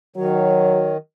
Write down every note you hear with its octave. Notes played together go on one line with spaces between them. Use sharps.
D#3 F#3 C#5